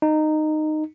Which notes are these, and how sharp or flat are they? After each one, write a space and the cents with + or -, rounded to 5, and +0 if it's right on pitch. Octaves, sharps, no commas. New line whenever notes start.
D#4 -15